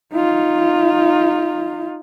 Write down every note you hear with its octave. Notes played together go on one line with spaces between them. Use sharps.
D#4 F4